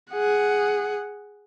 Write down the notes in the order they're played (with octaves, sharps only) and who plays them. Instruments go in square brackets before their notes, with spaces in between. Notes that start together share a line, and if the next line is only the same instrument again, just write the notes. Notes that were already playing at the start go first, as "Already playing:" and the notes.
[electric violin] G#4 F#5